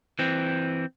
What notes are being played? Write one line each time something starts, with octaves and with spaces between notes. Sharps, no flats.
E3 C4